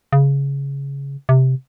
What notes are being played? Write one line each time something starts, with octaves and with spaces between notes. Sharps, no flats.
C#3
C3